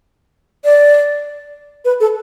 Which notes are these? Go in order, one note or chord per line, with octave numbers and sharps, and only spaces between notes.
D5
B4
A4